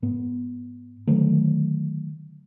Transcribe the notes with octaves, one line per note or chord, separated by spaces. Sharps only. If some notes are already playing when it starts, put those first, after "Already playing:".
G#2 B3
D3 D#3 F#3 A3